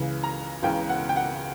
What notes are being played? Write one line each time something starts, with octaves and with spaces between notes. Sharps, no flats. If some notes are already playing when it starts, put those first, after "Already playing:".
Already playing: C#2 C#3 E3
A#5
C#2 C#3 E3 G5
F#5
G5
F#5